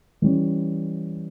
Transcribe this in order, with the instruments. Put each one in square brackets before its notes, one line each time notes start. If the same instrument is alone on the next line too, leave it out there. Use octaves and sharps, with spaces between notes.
[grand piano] E3 G3 C#4